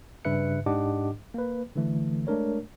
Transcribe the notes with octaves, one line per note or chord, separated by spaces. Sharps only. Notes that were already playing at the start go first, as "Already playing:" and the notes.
G2 C#3 B4 E5 F#6 C#7
G#2 D4 G4 D#5 F#5 D6
A#3 B4
D3 E3 A3
G#3 A3 D4 A#4 C#5